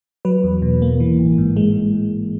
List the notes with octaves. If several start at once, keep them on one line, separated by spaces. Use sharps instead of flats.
F#3 B4
E2
B2
A#3
E3
A1
G#2
G#3